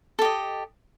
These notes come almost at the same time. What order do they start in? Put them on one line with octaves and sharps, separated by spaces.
A4 G4 D#5